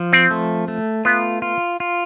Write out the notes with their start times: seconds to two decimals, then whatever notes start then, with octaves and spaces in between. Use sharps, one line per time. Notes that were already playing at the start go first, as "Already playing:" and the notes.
Already playing: F3
0.13 C4
0.31 A3
0.68 A3
1.05 B3 F4
1.42 F4
1.80 F4